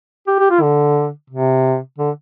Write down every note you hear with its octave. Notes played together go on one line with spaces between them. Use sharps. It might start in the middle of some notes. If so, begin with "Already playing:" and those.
G4
G4
F4
D3
C3
D3